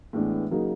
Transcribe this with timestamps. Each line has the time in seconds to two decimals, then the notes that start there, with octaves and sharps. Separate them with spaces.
0.13 A2 E3 G#3 B3 D4
0.51 C#3 F#3 A#3 D#4